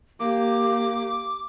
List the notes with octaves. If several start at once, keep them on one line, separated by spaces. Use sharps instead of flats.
A#3 G4 D6